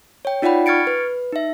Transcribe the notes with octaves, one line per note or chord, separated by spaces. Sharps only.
C#5 G5
D#4 F4 D5 F#5 G5 B5
C#6 F6 G#6 A6 C#7 D7
B4
D#4 E5